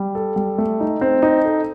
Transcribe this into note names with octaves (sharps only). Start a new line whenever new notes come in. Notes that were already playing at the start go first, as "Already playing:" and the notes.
Already playing: G3
A4
G3
A3
D#4
C4
D#4
A4